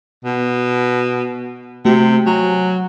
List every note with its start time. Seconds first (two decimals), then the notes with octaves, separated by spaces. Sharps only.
0.25 B2
1.85 C3 A3 F#4
2.26 F#3 G#5 A#5